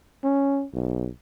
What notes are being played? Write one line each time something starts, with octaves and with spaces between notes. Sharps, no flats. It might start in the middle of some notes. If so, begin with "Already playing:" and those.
C#4
B1